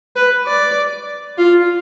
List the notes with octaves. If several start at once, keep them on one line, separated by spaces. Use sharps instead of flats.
B4
D5
F4